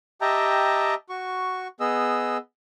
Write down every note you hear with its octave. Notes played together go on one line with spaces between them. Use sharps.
G4 D#5 E5 G5 A5 A#5
F#4 C#6
B3 G#4 D#5 E6